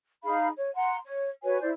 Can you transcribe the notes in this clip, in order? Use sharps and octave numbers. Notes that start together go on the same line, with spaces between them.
D#4 G#4 F5 B5
C#5
F#5 A#5 C6
C#5
F#4 B4 C#5 G#5
E4 C5 D5